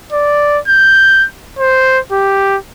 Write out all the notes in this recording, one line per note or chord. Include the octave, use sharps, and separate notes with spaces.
D5
G6
C5
G4